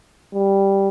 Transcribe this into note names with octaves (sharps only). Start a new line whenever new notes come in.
G3